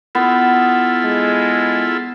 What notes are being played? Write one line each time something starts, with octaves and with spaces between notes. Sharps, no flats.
B3 E4 F4 A4
G#3